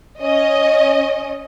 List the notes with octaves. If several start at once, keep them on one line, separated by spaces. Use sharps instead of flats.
C#4 D#5